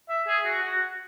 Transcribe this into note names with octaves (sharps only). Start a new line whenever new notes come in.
E5
G#4
F#4
F#4